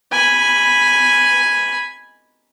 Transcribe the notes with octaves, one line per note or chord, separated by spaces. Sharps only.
G#5 B5